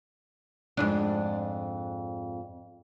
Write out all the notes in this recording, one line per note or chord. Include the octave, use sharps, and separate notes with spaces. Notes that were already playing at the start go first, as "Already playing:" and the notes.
F2 G#2 D4